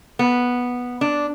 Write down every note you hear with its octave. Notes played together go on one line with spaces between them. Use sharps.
B3
D4